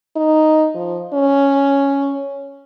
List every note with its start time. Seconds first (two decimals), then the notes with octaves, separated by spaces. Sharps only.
0.17 D#4
0.75 F3
1.14 C#4